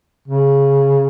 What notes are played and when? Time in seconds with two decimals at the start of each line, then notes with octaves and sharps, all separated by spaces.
0.28 C#3